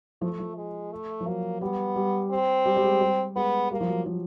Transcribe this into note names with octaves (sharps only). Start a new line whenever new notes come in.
F3 A3
F3
G#3
A3
F3
F#3 A#3
G3 B3
G3
C4
G3
G3
G#3
G3
G#3 B3
G3 A#3
F3
F#3
F3